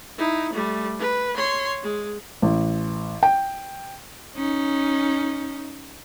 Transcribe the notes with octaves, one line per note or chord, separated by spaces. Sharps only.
D#4 E4
G3 A3
B4
C#5 C6
G#3
A1
G5
C#4 D#4